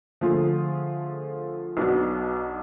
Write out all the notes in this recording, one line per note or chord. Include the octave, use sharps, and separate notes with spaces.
D3 F3 A3 F4 G#4
B1 B2 F#3 B3 D4